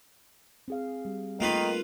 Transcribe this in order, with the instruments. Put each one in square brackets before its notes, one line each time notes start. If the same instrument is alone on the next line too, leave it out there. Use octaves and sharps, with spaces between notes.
[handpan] C4 G#4 F5
G3
[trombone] D#3 [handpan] A3 D#4 [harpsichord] A#3 F4 B4